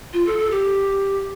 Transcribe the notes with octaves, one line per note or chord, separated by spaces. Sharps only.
F4
A4
A4
G4